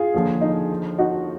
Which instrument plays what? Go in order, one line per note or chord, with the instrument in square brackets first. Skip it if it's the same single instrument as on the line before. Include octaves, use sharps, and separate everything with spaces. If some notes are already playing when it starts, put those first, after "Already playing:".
Already playing: [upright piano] F4 G#4
[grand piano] D#2 D3 F3
[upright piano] D#4
D#4 F#4